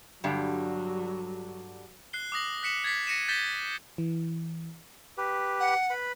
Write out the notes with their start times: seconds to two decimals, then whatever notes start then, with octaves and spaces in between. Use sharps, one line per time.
0.24 G2 D3 F#3 G3
2.13 F#6 C7 G7
2.32 D6 D#6 A#6 F#7
2.63 F#6 B6 C#7 E7 F#7
2.84 G#6 A6 B6 C7
3.07 A#6 C#7 D#7 E7
3.28 G6 A6 B6 E7 G7
3.98 E3
5.18 G4 B4
5.60 F#5
5.90 B4 B5